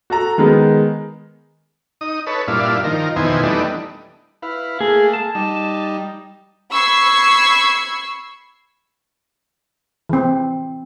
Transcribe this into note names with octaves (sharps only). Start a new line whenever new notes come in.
F#4 A4 A#5
D#3 G#3 B3 D#4
D#4 D#6
A4 B4 C#5
G2 A#2 D4 E4 F4
D#3 F3 A#4
F2 B2 D#3 E3 C5 G#5
E3 G3 A3 B3 D4 D#4
E4 B4 F5
A3 A#3 G#4
A5
G3 D#4
B5 C#6 E6 G#6 C7
E3 C4